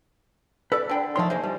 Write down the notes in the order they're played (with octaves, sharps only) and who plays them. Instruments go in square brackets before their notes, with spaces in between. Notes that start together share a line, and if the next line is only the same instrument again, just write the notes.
[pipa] A4 [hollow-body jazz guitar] B4 D5
[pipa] D3 G5 B5
[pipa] D#3 A3 [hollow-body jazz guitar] F3 C#5 C6
[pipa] G#3 A#3 [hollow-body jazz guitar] C5
[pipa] F3 [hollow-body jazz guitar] G3